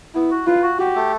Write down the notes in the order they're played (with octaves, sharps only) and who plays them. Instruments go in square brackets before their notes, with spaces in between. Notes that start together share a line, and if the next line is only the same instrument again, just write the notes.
[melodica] B3 [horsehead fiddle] E4
[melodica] F#4
[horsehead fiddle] F4 [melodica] B4
[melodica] F#4
[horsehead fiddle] F#4 [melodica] G4
[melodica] A3